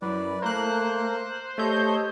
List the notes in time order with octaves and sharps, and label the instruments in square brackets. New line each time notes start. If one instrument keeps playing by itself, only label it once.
[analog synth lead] F#2 [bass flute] E4 [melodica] B4 D5
[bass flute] A3 [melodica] A#3 [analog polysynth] A#4 F#6 [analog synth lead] C5
[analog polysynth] A3 D#5 G6 [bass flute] G4 [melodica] A4 C#5